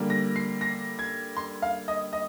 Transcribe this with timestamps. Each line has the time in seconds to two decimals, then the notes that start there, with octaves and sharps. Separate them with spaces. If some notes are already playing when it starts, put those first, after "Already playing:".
Already playing: D3 G3 A#3
0.10 A#6
0.36 C7
0.61 A#6
0.99 G#6
1.37 C6
1.62 F5
1.88 D#5
2.13 D#5